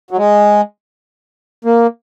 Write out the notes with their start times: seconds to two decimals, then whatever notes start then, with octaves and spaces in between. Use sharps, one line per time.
0.11 F#3
0.17 G#3
1.65 A#3